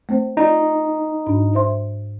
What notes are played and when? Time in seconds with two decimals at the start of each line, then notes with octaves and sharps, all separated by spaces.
0.09 A3 C4 C5
0.37 D#4 F4 D5
1.27 G#2 D4 B5
1.55 C5 E5 C6